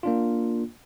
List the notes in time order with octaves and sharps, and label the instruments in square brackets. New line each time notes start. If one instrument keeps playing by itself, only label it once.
[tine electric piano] A#3 D4 F4